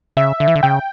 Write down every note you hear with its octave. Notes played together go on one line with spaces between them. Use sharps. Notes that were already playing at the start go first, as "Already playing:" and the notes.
C#3 E5
D3
E3
D3
C#3 G5